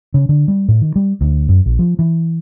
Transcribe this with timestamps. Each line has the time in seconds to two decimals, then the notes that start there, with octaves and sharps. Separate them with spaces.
0.14 C#3
0.29 D3
0.48 G3
0.68 A2
0.81 D#3
0.96 G3
1.21 D2
1.49 F#2
1.66 A#1
1.79 F3
1.99 E3